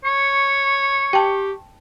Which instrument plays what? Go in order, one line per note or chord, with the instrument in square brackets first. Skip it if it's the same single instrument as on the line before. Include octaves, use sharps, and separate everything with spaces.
[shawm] C#5 [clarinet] C#6
[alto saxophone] G4 [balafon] G5 A5